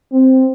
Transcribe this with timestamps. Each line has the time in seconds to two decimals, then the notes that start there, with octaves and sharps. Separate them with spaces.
0.12 C4